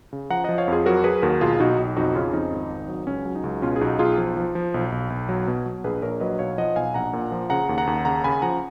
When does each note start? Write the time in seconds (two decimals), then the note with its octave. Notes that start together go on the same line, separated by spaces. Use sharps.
0.13 C#3
0.30 F3 F#5 A#5
0.44 F3 D#5 F#5
0.58 C#5 F5
0.68 F2 F4 G#4
0.86 F#3 F#4 A#4
1.04 F#3 G#4 B4
1.22 D#2 F#4 A#4
1.41 B1 F4 G#4
1.60 B1 D#4 F#4
1.78 B1
1.96 F2 D#4 F#4
2.15 C#3 C#4 F4
2.33 F2 D#4
2.52 G#1
2.70 G#1
2.88 F#3
3.07 C#2 C#4
3.25 F#3
3.35 D#4
3.44 C#2
3.62 B2 C#4 F4
3.76 G#4
3.81 B1 D#4 F#4
3.99 B1 F4 G#4
4.18 F3
4.37 F3
4.55 F3
4.74 B1
4.92 B1
5.10 B1
5.29 F#3
5.47 B2
5.66 F#3
5.84 A#1 G#4 B4
6.02 A#1 A#4 C#5
6.20 F#3 B4 D#5
6.39 B1 C#5 F5
6.58 F3 D#5 F#5
6.76 B1 F5 G#5
6.94 A#1 F#5 A#5
7.13 A#2
7.32 F3
7.50 C#3 F#5 A#5
7.69 D#2
7.78 F#5 A#5
7.87 D#2
8.05 C#3 F#5 A#5
8.24 C#3 G#5 B5
8.42 F3 F#5 A#5